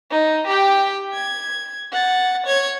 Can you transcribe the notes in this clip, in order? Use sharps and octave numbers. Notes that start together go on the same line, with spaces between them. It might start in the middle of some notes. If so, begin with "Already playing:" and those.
D#4
G4 G5
G#6
F#5 A6
C#5 G#6